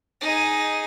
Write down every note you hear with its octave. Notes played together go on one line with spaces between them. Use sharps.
D#4 G#4